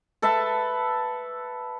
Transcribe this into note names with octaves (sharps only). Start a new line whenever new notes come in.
A4 B4 E5 A5